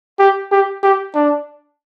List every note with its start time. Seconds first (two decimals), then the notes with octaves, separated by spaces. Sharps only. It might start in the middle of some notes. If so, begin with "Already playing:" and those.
0.19 G4
0.52 G4
0.83 G4
1.15 D4